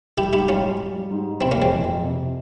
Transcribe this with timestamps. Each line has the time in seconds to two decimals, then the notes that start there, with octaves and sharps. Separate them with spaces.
0.18 G3 E4 G4
0.33 G#2 E4 G4
0.48 G3 C#4 F4
0.64 G3
0.79 G3
0.95 G3
1.11 G#2
1.26 G3
1.41 C3 C4 E4
1.51 A#3 C#4
1.57 F2
1.62 G#3 C4
1.72 E3
1.88 F2
2.03 C3